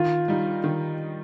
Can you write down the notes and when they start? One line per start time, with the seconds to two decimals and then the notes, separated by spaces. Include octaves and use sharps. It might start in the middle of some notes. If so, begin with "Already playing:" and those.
Already playing: D#3 F4
0.28 G3 D#4
0.64 D#3